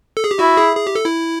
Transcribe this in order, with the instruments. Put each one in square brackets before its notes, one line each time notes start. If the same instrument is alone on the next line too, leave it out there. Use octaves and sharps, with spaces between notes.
[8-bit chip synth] A4
G#4
G4
[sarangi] E4 [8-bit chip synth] F#4
[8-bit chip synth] G#4
G#4
G4
A4
E4